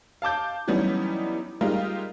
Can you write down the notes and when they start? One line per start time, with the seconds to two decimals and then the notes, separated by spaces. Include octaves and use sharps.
0.22 F5 A5 D6 G6
0.68 E3 F#3 G3 B3 C#4 D#4
1.61 G3 G#3 D#4 F4 G4 A#4